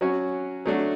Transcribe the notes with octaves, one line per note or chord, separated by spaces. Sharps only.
F#3 C#4 F#4
F#3 A3 D4 F#4